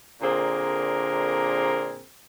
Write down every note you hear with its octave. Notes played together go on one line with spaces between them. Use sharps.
A#2 D3 C4 G#4 A#4